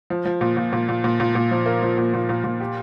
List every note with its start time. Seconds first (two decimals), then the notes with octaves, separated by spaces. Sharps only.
0.10 F3
0.25 F3
0.41 A#2
0.57 A#2
0.73 A#2
0.89 A#2
1.04 A#2
1.20 A#2
1.35 A#2
1.51 F3
1.66 A#3
1.82 F3
1.98 A#2
2.14 A#2
2.29 A#2
2.44 A#2
2.60 G4